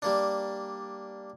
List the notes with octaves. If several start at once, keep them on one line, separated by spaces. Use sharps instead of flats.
G3 A#3 D4